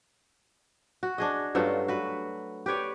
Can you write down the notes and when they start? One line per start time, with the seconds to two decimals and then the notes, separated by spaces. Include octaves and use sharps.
1.03 F#4
1.18 D4 G#4 D#5
1.55 G2 F#3 A3 F4
1.88 F#4 B4
2.66 G4 B4 C#5 D5